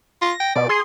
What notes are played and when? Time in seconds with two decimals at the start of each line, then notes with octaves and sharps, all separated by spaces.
0.22 F4 A#6
0.40 G5
0.56 B2 D5
0.69 G#4 C6